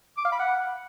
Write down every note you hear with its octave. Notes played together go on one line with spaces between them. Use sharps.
D6
F5
B5
F#5